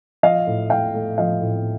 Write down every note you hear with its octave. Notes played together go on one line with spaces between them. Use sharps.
F3 D#5 F5
A2
A2 F5 G5
A3
F3 D#5 F5
A2